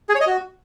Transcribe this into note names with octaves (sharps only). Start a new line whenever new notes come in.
G#4
C#5
D#5
F#4